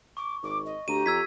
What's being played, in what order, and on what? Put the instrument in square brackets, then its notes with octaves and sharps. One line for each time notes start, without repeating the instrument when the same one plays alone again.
[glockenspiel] C#6 [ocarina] D6
[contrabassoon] G#1 [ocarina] D6
[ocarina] D#5
[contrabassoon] D2 [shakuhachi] G4 [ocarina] A#5 [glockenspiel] D#7
[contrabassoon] F2 [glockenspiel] E6 G#6 B6